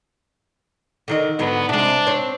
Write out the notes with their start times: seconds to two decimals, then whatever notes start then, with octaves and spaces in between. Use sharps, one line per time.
1.08 D3 D#3 D#5
1.39 G#2 D3 F#3 B3
1.69 C3 G#3 D4
2.07 C4 C#5